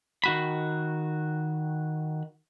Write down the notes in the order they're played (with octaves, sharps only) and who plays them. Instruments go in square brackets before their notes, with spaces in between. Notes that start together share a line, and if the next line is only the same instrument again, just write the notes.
[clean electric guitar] D#3 F#4 B5